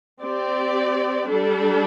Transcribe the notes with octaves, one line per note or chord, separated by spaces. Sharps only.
C4 G4 D5
G3 D4 A4